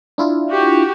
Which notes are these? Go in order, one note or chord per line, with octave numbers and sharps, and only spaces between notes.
D4 E4 F4
F#4 G4